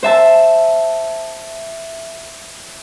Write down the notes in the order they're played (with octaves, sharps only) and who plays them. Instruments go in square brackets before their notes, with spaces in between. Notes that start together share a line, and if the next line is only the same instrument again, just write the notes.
[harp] C5 E5 A5